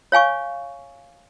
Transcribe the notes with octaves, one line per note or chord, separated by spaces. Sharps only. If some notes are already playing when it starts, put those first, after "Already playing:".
C#5 F5 G#5 C#6